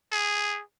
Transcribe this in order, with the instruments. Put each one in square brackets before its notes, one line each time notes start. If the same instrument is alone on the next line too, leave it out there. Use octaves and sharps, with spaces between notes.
[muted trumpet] G#4